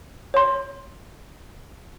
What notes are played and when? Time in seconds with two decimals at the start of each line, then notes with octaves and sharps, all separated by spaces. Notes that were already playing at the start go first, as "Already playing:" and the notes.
0.34 C#5 C6